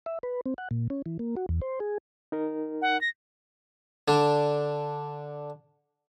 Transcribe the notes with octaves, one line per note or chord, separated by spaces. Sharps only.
E5
B4
C4
F#5
A#2
C#4
E3
A#3
F#4
E2
C5
G#4
D#4 A#4
F#5
A#6
D3 D4